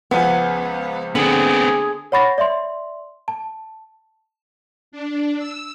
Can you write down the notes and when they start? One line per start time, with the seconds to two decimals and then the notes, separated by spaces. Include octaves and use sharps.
0.11 C#2 F3 B3 G#5
1.15 D3 B3 C4 G#4
2.12 C#5 F#5 B5 C#6 A6 A#6
2.38 D5 E5 C6
3.28 A5
4.92 D4
5.38 E6